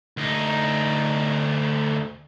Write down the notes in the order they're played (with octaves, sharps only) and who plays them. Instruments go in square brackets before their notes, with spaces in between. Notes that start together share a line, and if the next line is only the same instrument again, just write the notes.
[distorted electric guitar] D2 D#4